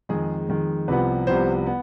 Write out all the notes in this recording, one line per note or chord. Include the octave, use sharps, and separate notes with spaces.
F2 D#3 G#3 G#4
F2 D#3 G#3
C2 C3 F3 B3 B4
C2 C3 F3 B3 C5
B3